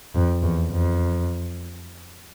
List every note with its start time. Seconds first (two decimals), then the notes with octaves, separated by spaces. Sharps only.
0.15 F2
0.42 E2
0.72 F2